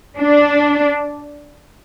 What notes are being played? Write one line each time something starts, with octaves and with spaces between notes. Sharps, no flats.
D4